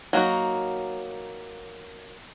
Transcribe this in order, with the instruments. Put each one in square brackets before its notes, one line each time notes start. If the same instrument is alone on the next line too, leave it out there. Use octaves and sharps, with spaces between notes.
[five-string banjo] F#3 A#3 B3 D#4 F#4